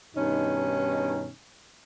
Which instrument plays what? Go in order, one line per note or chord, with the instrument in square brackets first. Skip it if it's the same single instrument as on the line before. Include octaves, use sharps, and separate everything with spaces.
[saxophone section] G2 B2 D#3 C#4 D#4